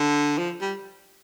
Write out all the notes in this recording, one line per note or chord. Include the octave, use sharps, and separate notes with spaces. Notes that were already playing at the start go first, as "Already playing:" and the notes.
Already playing: D3
F3
G3